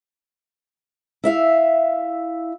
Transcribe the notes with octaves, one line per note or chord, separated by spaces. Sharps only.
E4 E5 F5